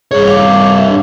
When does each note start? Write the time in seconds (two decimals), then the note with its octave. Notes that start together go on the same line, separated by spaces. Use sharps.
0.11 G2 G#4 C#5
0.27 F5 D6
0.76 E5
0.88 D4